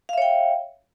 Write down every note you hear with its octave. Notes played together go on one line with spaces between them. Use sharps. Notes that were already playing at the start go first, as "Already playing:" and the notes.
C#5 E5 F5 G5